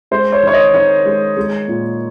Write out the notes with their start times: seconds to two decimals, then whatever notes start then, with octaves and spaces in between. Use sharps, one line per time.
0.11 G#3 C5
0.32 C#5
0.43 D#3 C#5
0.53 D#5
0.74 D#3 C#5
1.05 G#3
1.37 G#3
1.68 A#2